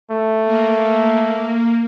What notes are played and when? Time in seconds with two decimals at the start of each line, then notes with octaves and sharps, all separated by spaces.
0.11 A3
0.46 A#3